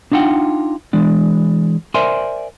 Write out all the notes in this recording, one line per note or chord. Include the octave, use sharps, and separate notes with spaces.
D4 D#4 F4 F#5 G5
E3 G#3 D4
A#4 C5 D5 E5 G#5 C6